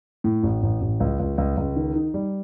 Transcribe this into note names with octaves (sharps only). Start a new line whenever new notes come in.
A2
A1
A1
A1
C#2
C#2
C#2
C#2
D#3
D#4
G3